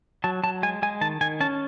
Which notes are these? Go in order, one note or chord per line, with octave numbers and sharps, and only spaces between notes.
F#3 A5
F#3 A5
G#3 G#5
G#3 G#5
D#3 A5
D#3 G#5
C#4 A5